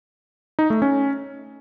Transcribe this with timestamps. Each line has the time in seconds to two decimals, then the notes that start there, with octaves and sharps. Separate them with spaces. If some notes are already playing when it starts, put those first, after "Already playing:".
0.59 D#4
0.70 A3
0.82 C#4